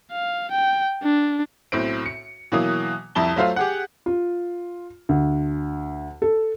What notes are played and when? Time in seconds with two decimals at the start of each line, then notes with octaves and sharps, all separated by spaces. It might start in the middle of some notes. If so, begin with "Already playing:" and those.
0.12 F5
0.51 G5
1.03 D4
1.72 B1 A2 C4 D7
2.06 C#7
2.52 B2 E3 F#3 A#3 D#6
3.15 C2 F2 E4 A5 G7
3.36 F#3 A3 F4 C5 F5
3.56 G4 G#4 F#5
4.06 F4
5.09 D2
6.22 A4